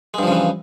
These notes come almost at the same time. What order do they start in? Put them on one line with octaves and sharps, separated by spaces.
G#3 G2 F3 C#3 E3